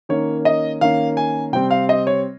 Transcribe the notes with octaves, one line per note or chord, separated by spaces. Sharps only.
D#3 A#3 C#4 C#5
D#5
D#3 A#3 C#4 F5
G#5
C3 G3 C4 G5
F5
D#5
C#5